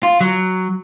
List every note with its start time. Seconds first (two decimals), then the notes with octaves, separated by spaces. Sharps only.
0.03 F4
0.21 F#3